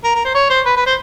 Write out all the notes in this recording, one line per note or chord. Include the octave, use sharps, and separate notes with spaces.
A#4
A#4
C5
C#5
C5
B4
B4
C5